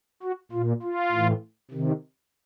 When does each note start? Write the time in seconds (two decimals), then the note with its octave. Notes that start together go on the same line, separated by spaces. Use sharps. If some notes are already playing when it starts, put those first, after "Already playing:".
0.23 F#4
0.52 A#2 F4
0.82 F4
1.12 A2 E3
1.71 C3 D#3